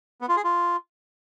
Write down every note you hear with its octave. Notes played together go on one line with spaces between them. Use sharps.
B3
F4
G#4
F4